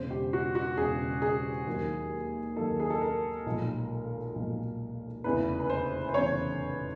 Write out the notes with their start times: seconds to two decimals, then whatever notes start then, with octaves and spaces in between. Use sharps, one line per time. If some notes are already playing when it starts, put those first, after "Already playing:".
Already playing: E1 E2 C#3 C5
0.11 G4
0.33 F#4
0.55 F#4
0.77 E1 E2 C#3 G#4
1.22 G#4
1.67 D#2 D#3 F#3 A#3
2.57 D#2 D#3 F#3 A#3 A4
2.80 G#4
2.90 A4
3.01 A#4
3.46 B1 A#2 F3 G#3
4.35 B1 A#2 F3 G#3
5.24 F1 E2 C#3 E3 B4
5.60 B4
5.70 C5
6.09 C5
6.14 F1 E2 C#3 E3 C#5